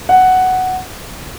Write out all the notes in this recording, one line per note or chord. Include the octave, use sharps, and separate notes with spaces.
F#5